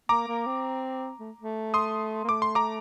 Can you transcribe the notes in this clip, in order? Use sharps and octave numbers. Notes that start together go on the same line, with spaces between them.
A#3 A#5 D6
A#3
C4
A3
A3
C6 D#6
A#3
A3 D6
C6
A#5 D6